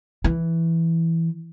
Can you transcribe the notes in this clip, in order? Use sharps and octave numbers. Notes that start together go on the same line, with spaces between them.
E3